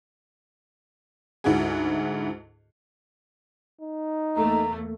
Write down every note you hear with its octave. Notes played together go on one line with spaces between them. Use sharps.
D2 G#2 E4 F#4 G#4
D#4
E2 A3 A#3 A#5